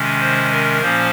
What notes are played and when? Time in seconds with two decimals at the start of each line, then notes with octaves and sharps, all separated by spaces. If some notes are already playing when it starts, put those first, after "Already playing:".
Already playing: C3 D#3 G#3 C#4
0.20 C5
0.51 A#4
0.81 A#2 F3 A#3 C#4 C5